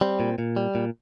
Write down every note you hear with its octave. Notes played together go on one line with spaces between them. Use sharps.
G3 C4
A#2
A#2
G3
A#2